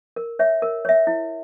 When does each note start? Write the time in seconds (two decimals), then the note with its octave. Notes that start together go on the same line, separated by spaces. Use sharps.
0.16 A#4
0.39 C#5 E5
0.62 A#4
0.85 C#5 E5
1.07 E4